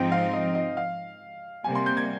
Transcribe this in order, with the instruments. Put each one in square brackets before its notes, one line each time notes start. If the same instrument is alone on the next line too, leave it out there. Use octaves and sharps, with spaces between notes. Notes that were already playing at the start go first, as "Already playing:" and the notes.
Already playing: [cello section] G#2 F3 C4 D#4 [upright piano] G5
[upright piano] F5
D#5
D#5
F5
[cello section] C3 G3 A#3 [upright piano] G#5
[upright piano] C6
G6
G#6